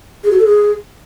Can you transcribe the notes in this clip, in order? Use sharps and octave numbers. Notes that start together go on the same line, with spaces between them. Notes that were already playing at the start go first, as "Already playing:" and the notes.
G#4
F#4
A4
G#4